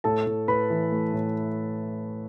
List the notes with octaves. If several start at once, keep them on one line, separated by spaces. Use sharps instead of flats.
A2 A4 A5
A2
A2 B4 B5
E3
A3
A2